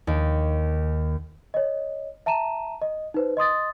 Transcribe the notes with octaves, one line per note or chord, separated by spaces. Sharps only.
D#2
C#5 D#5
E5 A5 A#5 D#7 E7
D#5
D#4 B4 C5
D#5 C6 D#6 A6